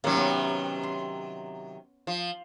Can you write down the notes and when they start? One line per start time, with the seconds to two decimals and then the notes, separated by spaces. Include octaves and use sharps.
0.04 C3 D#3 F#3 A#3 C#4
0.17 B3
0.83 C6
2.07 F3